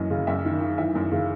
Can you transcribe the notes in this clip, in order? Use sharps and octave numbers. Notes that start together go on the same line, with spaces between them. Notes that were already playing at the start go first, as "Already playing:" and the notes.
Already playing: F#2 E3 D#5
C#3
F#2 E5
D#3
D#3
E3 E5
F#2
C#3